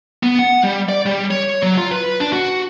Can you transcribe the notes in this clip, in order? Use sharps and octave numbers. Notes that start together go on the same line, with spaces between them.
B3
F#5
G3
D5
G3
C#5
F#3
F4
B4
D4
F#4